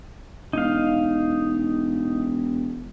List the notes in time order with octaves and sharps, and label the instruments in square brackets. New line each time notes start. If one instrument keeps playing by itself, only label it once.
[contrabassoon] E1 [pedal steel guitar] D#4 F5